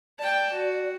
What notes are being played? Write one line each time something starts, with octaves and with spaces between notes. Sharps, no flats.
D5 G5 A5
F#4